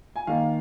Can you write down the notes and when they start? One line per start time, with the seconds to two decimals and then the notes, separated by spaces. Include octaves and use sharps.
0.16 G#5
0.27 D#3 A#3 F5